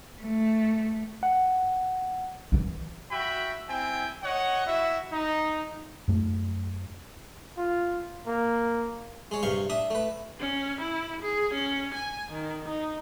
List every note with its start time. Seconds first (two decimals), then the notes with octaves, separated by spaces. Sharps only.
0.22 A3
1.23 F#5
2.52 D#3 E3
3.11 F#4 E5 G5 B5
3.69 C4 E4 G5 G#5
4.23 C#5 D#5 F#5
4.67 E4 F#4 E5
5.12 D#4
6.08 F#2 A3
7.58 F4
8.27 A#3
9.31 G#3 C#5
9.43 G2 C3 F5 C#6
9.70 D4 E5 D#6
9.91 A3 B4
10.40 C#4
10.80 E4
11.21 G#4
11.53 C#4
11.94 G#5
12.31 D#3
12.68 D#4